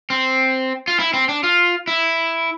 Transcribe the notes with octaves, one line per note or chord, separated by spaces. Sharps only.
C4
F4
E4
C4
D4
F4
E4